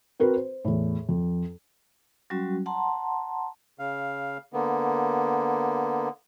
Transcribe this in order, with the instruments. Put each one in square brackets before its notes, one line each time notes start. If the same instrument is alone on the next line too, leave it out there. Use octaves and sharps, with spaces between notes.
[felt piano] C4 F#4 A#4 B4
C5
E2 A2
F2
[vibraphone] F#3 G3 C#4 F#4
F#5 A5 A#5 C6
[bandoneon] C#3 F5
D3 A#3 B3